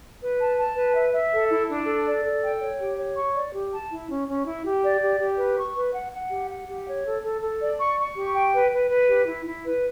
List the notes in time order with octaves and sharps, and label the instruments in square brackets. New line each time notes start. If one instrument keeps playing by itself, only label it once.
[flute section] B4
A5
A5
B4
E5
E5
A4
E4
D4
A4
D5
A4
G5
C#5
G4
C#5
C#6
D5
G4
A5
E4
C#4
C#4
E4
G4
D5
G4
G4
B4
C#6
B4
F#5
F#5
G4
F#5
G4
C#5
A4
A4
A4
D5
C#6
C#6
G4
G5
B4
B4
B4
G4
E4
E4
B4